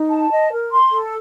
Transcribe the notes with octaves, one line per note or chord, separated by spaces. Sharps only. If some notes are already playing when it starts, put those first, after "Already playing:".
Already playing: D#4
A5
D#5
A#4
C6
A4